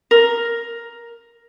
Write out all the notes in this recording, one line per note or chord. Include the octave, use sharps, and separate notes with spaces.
A#4